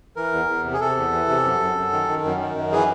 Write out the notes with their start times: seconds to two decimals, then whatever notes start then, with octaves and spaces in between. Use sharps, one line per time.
0.16 E3 A#4
0.32 E2
0.48 E2
0.64 C3
0.73 G#4
0.80 C3 A4
0.96 E2
1.13 E3
1.28 C3
1.44 F#2
1.60 F#2
1.76 F#2
1.92 D#3
2.08 D#3
2.24 F#2
2.40 D#3
2.57 F#2
2.72 E3 G#4